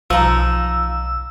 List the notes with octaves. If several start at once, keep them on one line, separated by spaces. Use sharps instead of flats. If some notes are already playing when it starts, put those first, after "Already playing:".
B1 F3 D#4 A#5 E6